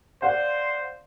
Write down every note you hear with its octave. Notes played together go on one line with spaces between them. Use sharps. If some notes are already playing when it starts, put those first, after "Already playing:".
C5 D5 F5 F#5